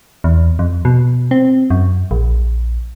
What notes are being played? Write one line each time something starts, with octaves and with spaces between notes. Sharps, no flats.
E2
F2
B2
C4
F#2
A#1